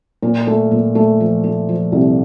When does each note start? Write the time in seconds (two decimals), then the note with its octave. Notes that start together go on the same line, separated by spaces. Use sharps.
0.23 A#2
0.47 A3
0.71 A#2
0.95 A3
1.20 F3
1.44 A3
1.69 F3
1.92 C2